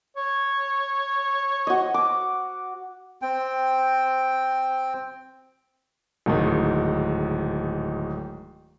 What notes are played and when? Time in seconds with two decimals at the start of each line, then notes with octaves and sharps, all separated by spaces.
0.17 C#5
1.67 F#4 D#5
1.94 D6
3.22 C4 G5
6.26 D1 G#2 D#3